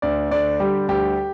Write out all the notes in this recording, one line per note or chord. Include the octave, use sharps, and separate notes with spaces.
D2 D5
D3 D5
G3 G4
D2 G4